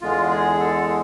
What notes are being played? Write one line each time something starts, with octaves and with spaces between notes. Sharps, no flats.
E2 D3 G#3 F4
G#4
A4